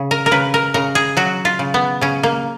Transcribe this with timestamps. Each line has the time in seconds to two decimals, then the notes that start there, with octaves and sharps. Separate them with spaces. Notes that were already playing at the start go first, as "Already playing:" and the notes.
Already playing: C#3
0.11 A#4
0.26 A#4
0.31 C#3 B4
0.54 A#4
0.74 C#3 A#4
0.95 G#4
1.17 F#3 F#4
1.45 F4
1.59 C#3
1.74 B3
2.01 C#3 C#4
2.23 A#3